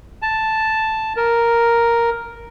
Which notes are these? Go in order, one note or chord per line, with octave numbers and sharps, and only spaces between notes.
A5
A#4